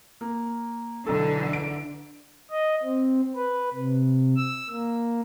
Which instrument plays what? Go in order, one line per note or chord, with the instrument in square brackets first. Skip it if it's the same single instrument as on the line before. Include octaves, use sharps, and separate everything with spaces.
[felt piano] A#3
[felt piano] B1 A4 [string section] D3 E3
[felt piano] D7
[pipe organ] D#5
C4
B4
C3
E6
A#3